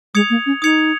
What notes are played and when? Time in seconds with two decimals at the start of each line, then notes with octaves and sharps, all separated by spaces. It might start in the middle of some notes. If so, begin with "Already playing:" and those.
0.14 G#3 D#6 G#6 C#7 F7
0.30 A#3
0.46 C#4
0.62 D#4 D#6 G#6 C#7 F7